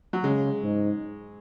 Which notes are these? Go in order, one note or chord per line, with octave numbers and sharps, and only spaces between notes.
F#3
C#3 G#3
G#2